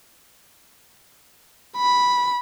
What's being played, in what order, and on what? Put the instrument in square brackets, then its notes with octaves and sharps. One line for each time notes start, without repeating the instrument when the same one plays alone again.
[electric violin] B5